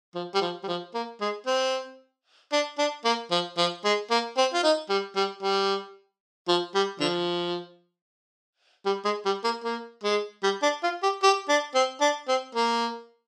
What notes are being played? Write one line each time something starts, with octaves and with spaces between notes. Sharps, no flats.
F3
G3
F3
G3
F3
A#3
G#3
C4
D4
D4
A#3
F3
F3
G#3
A#3
C4
F4
D#4
G3
G3
G3
F3
G3
D3 F3
G3
G#3
G3
A#3
A#3
G#3
G3
D4
F4
G4
G4
D4
C4
D4
C4
A#3